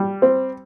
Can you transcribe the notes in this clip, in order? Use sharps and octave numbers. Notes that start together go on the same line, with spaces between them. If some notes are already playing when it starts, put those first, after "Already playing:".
Already playing: G3
C4